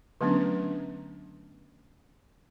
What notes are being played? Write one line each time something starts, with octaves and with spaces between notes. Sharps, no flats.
D3 F#3 A3 B3 C#4 D4